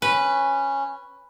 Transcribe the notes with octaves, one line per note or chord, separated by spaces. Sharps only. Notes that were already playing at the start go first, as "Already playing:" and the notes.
C#4 B4